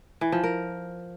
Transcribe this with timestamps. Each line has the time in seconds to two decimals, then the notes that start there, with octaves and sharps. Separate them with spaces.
0.21 E3
0.32 F3
0.44 A#4